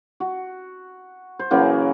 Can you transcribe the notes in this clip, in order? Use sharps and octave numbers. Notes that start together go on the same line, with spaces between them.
F#4
C5
C#3 E3 F#3 A#3